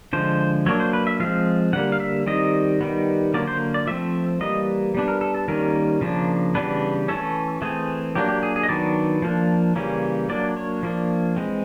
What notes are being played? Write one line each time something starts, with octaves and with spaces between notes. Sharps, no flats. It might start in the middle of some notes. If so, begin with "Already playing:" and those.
D3 F3 G#3 C5
F#3 A#3 D4 C#5
C5
B4
E5
F3 G#3 C4 F5
D3 G3 A#3 F#5
F5
E5
D#3 G3 C4 D#5
D#3 G3 B3
D3 F#3 A#3 D5
C5
D5
F3 A3 C4 E5
E3 G3 A#3 D#5
G3 B3 D4
A#4
A4
A4
D#3 G3 A#3 C#4 A#4
C#3 F3 A#3 D4
C#3 E3 G3 B3 D4 B4
E3 A3 C#4 A4
E3 A3 C4 G#4
F#3 A#3 D4 G4
G4
G#4
G#4
D#5
D#3 F#3 B3 D4 D5
F3 A#3 D4
C#3 E3 G3 A#3 C#4
F#3 A#3 D4 D5
C#5
F3 A#3 D4
E3 G#3 C4